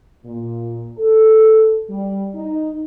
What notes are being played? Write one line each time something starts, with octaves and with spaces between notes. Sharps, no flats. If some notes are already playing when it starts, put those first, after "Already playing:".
A#2
A4
G3
D#4